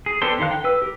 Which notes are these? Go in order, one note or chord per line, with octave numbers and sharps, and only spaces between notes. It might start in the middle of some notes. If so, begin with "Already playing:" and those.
G#4
B3 D4 G4 A4 C5
D3 D#3 C5 F5 F#6
G5
B4 E6
G4 A#4